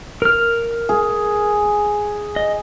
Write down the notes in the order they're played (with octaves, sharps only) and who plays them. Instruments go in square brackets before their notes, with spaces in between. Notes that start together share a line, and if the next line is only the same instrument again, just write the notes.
[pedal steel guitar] A#4 F6
[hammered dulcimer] G#4
[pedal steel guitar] D#5